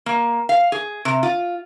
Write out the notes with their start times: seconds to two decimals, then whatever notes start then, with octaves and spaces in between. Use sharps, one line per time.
0.06 A#3
0.49 F5
0.72 G#4
1.05 C3
1.23 F4